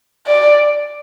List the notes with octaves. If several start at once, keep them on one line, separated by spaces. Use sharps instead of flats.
D5